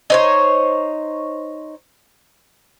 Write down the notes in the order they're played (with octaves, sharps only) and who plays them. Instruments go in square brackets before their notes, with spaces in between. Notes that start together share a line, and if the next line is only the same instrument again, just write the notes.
[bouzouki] D#4 C5 C#5